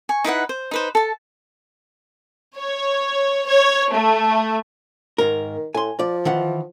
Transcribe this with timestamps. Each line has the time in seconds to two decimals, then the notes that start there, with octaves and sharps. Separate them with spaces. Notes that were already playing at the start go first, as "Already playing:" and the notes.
0.09 G#5 C#6
0.24 D#4 E4 B4 F#5
0.49 C5
0.71 D#4 B4 C5
0.95 A4 A5
2.57 C#5
3.47 C#5
3.93 A3
5.18 G#2 D#3 A#4
5.74 A2 G#5 C6
5.99 F3 D5
6.25 D#3 E3 F#5